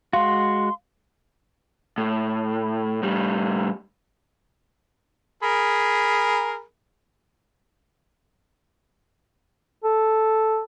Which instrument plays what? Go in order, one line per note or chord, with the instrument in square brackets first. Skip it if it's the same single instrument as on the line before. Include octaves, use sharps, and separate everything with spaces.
[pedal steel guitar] G#3 F#4 [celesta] F5 [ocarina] C6
[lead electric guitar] A2
A2 G3
[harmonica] G#4 A#4 B5
[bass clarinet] A4